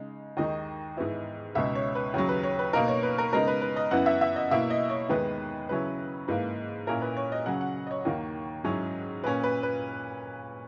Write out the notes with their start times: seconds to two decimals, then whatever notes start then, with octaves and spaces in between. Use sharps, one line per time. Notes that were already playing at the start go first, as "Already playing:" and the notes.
Already playing: C#3 G#3 D#4
0.37 D#2 D#3 G#3 D#4 D#5
0.97 G#2 E3 B3 E4
1.55 C#2 B2 G#3 D#4 E5
1.75 C#5
1.95 B4
2.14 D#2 C#3 F#3 C#5
2.29 B4
2.43 C#5
2.59 B4
2.73 B2 A#3 D#4 A#4
2.88 C#5
3.03 B4
3.18 A#4
3.33 C#3 G#3 B3 D#4 A#4
3.47 B4
3.62 B4
3.76 D#5
3.91 F#2 E3 B3 E4 F#5
4.06 E5
4.21 E5
4.36 D#5
4.51 B2 A#3 E4 E5
4.70 D#5
4.90 C#5
5.09 D#2 D#3 G#3 B3 B4
5.69 C#3 F#3 C#4 E4 B4
6.28 G#2 E3 A#3 B4
6.87 A#2 A#3 C#4 E4 A#4
7.02 B4
7.17 C#5
7.32 D#5
7.46 C#3 F#3 C#4 F#5
7.61 F#5
7.87 D#5
7.91 C#5
8.05 D#2 D#3 A#3
8.64 G#2 F#3 C#4 E4
9.23 A#2 A#3 C#4 B4
9.44 B4
9.63 B4